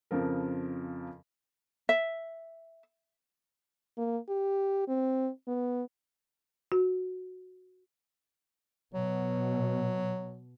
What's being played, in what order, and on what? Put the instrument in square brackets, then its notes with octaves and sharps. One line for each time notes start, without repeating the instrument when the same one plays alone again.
[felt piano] F2 C#3 F3 A#4
[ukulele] E5
[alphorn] A#3
G4
C4
B3
[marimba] F#4
[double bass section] B2 [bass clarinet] F#3